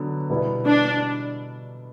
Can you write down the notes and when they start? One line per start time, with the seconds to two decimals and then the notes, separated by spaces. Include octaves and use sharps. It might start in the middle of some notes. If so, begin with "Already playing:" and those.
Already playing: D3 F#3 B3
0.30 B2 G3 B3 E4
0.66 D4